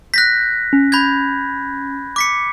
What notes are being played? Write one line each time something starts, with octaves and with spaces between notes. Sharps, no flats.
F#6 G6 A#6 B6
C#4
B5 G6 G#6
D6 B6 C#7